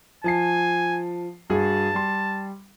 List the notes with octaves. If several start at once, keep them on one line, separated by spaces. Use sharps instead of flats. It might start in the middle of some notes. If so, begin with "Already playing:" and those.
F3 G#5 A5 C7
G2 F#4 G#4 A5
G3 C6